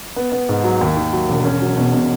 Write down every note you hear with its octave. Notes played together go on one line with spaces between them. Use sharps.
B3
B3
G#2
F#3
D#2
D#3
F#3
E1
C#4
F#3
B2
B2